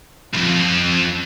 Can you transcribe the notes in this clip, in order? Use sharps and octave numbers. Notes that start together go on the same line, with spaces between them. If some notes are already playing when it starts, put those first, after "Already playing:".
C2 F2